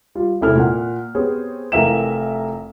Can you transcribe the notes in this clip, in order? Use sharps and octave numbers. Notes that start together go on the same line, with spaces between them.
G3 F4
E1 C3 E4 A4 F6
A#2 F#5
B3 C4 G4 G#4 C5 C#5
F1 E3 A#4 E5 F5 E7